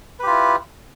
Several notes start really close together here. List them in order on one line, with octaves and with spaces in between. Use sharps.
B4 G4 F4 E4